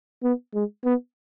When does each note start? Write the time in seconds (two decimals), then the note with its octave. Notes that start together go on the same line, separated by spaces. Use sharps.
0.23 B3
0.54 G#3
0.85 B3